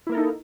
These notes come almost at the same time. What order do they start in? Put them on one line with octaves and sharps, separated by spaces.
E4 A#3 A#4 A4 D#4